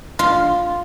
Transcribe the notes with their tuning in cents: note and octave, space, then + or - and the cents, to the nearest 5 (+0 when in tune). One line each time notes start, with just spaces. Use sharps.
F4 +0